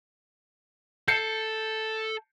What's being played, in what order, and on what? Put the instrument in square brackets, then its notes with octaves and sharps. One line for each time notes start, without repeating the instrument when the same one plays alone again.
[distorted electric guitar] A4 [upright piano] G6 C7 C#7